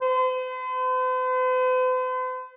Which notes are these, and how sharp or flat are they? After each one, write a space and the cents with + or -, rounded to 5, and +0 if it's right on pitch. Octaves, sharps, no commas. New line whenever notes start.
C5 -45